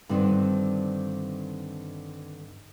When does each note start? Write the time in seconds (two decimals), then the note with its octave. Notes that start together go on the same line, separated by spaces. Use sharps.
0.09 G2 D3 D#3 C4